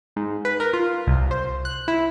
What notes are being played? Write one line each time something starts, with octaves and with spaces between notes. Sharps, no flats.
G#2
B4
A#4
F4
C2
C5
F#6
E4